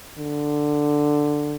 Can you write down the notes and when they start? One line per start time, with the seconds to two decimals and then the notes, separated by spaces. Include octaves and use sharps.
0.18 D3